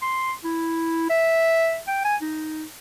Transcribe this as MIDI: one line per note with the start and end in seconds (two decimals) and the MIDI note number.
0.02 0.33 84
0.45 1.07 64
1.10 1.79 76
1.88 2.01 79
2.05 2.16 80
2.22 2.65 63